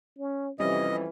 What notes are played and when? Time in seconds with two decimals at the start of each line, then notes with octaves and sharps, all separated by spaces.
0.18 C#4
0.60 F2 C3 E3 G3 C#4 D#5